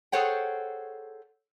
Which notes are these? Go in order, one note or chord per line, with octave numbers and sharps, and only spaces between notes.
G#4 A4 C5 C#5 F#5 G5